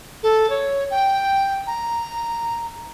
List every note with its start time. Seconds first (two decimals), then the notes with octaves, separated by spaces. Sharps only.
0.23 A4
0.50 C#5
0.91 G5
1.67 A#5